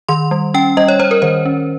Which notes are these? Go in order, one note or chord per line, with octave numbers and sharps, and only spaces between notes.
D#3 C6
G3
C#4 G5
G3 D#5
C#5
G3 C5
A#4
D#3 C5
C#4